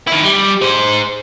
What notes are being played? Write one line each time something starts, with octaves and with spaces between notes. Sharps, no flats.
D#3 E4
G3
G#4 C5